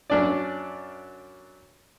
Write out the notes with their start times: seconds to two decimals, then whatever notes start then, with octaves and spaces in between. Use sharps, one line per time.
0.10 F#2 D4 D5